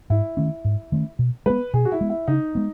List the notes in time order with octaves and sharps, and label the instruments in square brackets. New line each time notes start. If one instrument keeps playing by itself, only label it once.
[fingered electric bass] G#2 [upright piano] E4
[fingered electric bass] D#3 A3 C#4
G#2
D#3 A3 C#4
B2
[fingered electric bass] G#3 B3 [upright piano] B4
[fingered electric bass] B2 [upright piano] G#4
[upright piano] F#4
E4
[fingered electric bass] G#3 B3
[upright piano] E4
[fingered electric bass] C#3 [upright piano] D#4
[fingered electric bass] G#3 B3